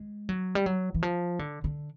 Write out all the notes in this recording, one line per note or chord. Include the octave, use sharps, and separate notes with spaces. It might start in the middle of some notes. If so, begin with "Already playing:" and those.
Already playing: G#3
F#3
G3
F#3
E3
F3
D3
D3